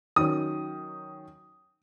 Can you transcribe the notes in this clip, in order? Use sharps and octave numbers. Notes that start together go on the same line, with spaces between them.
D#3 F#3 C#4 D#6